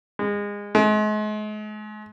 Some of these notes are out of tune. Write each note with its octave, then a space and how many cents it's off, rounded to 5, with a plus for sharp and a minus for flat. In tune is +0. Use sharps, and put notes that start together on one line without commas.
G#3 -25
G#3 +40